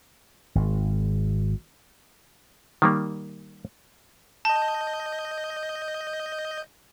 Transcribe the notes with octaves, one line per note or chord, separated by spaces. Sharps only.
G#1
D#3 G3 A#3
D#5 A5 G6